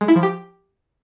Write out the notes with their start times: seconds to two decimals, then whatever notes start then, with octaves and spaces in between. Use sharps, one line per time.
0.01 G#3
0.08 E4
0.16 F3
0.23 G4